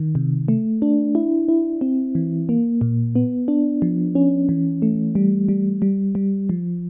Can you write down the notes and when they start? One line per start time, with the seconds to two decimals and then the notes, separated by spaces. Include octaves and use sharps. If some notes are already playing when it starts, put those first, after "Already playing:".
Already playing: D#3
0.15 C3
0.48 A3
0.82 D4
1.15 E4
1.48 E4
1.81 C4
2.15 E3
2.49 A#3
2.81 A#2
3.16 B3
3.48 D4
3.82 F3
4.15 C#4
4.49 E3
4.82 A3
5.15 G3
5.49 G3
5.82 G3
6.15 G3
6.49 F3